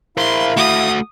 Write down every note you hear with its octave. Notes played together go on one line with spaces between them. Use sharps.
E4 A#4 C5 F5 C6
A3 F#4 D#6